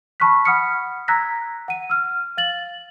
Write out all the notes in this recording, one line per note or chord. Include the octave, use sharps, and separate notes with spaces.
A5 B5 C#6 F6 F#6 B6
F#5 B5 D#6 F6 B6 C#7
A#5 E6 F#6 G#6 A#6 B6
F#5 D#7
E6 F6
F5 A6 F#7